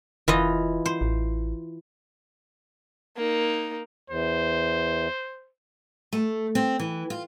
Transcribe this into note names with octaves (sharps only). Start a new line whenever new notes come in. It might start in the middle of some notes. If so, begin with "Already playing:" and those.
F1 E3 F4 D#5
C5
A1
A#3 D#4
E2 C5
A3
C4
E3
F4